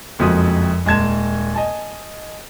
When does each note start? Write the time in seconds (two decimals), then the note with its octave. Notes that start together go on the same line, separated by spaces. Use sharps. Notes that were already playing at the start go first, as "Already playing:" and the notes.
0.19 F#1 F2 F3 G#3 F#4 D#6
0.85 D#1 G#3 A5 G#6 E7
1.54 D#5 G#5 A5